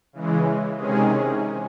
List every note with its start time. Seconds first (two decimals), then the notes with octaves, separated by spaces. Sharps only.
0.13 C#3 E3 G#3
0.76 C3 D#3 G#3 C#4 G#4